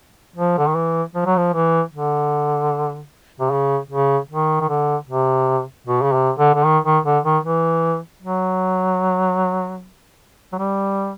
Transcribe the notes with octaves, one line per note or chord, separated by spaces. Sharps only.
F3
D3
D#3
E3
F3
F#3
F3
E3
D3
C3
C#3
C#3
D#3
D#3
D3
C3
B2
C#3
C3
D3
D3
D#3
D#3
D3
D#3
E3
F#3
F#3
G3